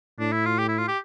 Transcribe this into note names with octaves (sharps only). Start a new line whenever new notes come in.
A2 D4
E4
F4
G4
E4
F4
G4